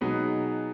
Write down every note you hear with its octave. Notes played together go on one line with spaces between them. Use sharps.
B2 F#3 B3 D#4 G#4